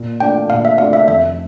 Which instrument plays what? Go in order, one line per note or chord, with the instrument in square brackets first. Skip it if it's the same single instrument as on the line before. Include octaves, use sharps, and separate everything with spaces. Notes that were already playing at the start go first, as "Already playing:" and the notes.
Already playing: [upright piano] A#2
[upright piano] A3 D4 F4 [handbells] G5
[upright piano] A#2 [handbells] F5
[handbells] E5
[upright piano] A3 D4 F4 [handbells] F5
[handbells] E5
[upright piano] F1 [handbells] E5